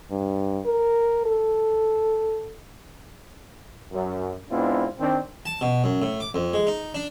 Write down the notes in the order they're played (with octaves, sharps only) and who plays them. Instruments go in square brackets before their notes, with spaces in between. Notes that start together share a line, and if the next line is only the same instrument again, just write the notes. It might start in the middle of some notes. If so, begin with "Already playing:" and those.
[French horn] G2
A#4
A4
[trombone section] F#2
G#2 B3 C4 D4 E4 F4
D#3 C4 D4
[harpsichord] A5
B2
F#2
A2
D6
F2
G#3
D#4
D4